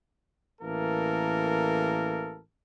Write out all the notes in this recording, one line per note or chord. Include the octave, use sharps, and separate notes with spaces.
A1 E3 A#3 A4 A#4